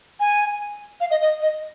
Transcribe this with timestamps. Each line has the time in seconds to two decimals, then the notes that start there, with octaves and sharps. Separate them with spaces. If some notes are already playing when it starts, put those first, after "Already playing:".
0.20 G#5
1.01 F5
1.11 D#5
1.22 D#5
1.42 D#5